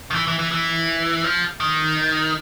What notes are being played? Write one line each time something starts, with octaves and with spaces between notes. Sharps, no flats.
D#3
E3
E3
E3
E3
F3
D#3